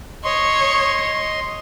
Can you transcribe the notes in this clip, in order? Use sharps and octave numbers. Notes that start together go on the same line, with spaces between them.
C#5 D#5 C6